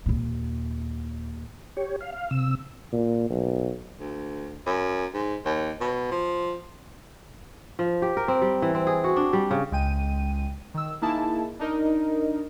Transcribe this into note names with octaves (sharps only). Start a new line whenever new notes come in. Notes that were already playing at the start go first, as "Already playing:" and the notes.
D#2 A#2
G4 C#5
F5
F5
C3 E6
A#2
B1
D2
F#2
G#2
D#2
B2
F3
F3
G4
A#4
C4
G3
E3
C4
G#4
F#4
D4
G3
C#3
C#2 G#3 G5 D#7
D#3 E6
A#3 D#4 E4 G#4 A5
D4 D#4 A#4 D#5